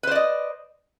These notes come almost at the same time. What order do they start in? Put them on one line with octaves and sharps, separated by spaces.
B4 C5 D5 D#5